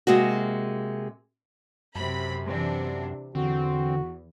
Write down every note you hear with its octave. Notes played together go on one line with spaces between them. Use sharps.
C3 G#3 A#3 F#4
F#2 C3 B5
C3 E3 D4
E2 D3 C4 F#4